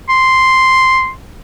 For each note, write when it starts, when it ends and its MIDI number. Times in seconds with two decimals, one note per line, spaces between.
0.09 1.10 84